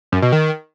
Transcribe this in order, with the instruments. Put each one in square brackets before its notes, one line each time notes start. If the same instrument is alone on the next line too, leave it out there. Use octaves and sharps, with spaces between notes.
[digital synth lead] F#2
B2
D#3